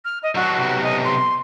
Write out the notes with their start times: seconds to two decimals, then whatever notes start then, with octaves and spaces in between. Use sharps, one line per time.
0.04 F6
0.22 D#5
0.35 F#3 D4 F#4
0.57 B1 C3
0.83 D#5
1.04 C6